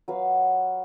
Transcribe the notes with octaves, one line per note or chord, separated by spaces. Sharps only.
F#3 B4 F5